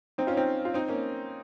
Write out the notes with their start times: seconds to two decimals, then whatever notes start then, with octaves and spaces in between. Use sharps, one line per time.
0.18 C4 D#4
0.27 C#4 F4
0.36 C4 D#4
0.65 F4
0.74 C4 D#4
0.89 A#3 C#4